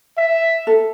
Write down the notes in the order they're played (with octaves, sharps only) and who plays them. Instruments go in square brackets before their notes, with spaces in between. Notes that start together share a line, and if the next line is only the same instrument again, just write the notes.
[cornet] E5
[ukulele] A4